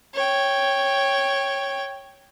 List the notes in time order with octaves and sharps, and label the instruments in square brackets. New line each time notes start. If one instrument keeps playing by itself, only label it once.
[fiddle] C#5 G5